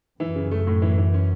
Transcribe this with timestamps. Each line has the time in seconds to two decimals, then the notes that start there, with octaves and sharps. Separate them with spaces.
0.20 F#2 E3
0.35 C#3
0.51 A3
0.67 A2
0.82 E3
0.98 E3
1.14 C#4